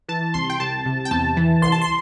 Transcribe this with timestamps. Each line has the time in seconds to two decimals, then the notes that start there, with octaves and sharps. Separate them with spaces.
0.08 E3 A5
0.34 C2 C6
0.50 G5
0.60 C2 A5
0.86 C3
1.05 G5
1.11 E2 A5
1.37 E3
1.62 C2 C6
1.72 A5
1.82 C6